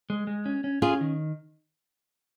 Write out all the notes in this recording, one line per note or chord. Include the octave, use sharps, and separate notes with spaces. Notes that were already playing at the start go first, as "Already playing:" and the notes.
G#3
G#3
C#4
C#4
C#4 F4 G#4
D#3